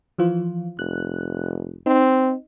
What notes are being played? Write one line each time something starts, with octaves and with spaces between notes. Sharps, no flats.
E3 F3 F4
F1 F#6
C4 D#4